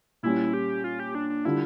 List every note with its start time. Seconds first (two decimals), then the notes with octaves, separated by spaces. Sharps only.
0.23 A#2 G3 C#4 E4
0.53 G4
0.84 F4
1.00 G4
1.15 D4
1.30 D4
1.45 D3 G3 D4 E4 F4